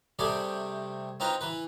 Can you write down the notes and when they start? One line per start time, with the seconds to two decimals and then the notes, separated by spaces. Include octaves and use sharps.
0.19 C3 G3 A3 G#4 D5
1.20 C4 D#4 F4 B4
1.41 E3 B4